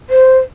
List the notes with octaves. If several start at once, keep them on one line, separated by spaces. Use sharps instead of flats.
C5